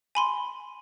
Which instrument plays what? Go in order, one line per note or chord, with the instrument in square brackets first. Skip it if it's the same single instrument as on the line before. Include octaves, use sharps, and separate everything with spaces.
[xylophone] G#5 B5 C6